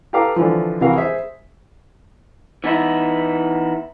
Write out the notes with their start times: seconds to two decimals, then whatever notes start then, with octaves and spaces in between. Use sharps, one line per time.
0.13 G4 A4 B4 F5 A#5 D6
0.36 D3 E3 F3
0.81 C2 C3 E3 F#4 A#4 F5
0.96 G#4 C5 E5
2.64 E3 B3 D#4 E4